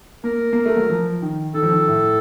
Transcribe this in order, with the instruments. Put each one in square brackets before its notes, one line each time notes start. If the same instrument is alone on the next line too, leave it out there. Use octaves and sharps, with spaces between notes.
[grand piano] A#3 [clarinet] A#4
[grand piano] A#3
A3
F#3
F3
D#3
[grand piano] D#3 [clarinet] A4
[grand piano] F3
D#3
A2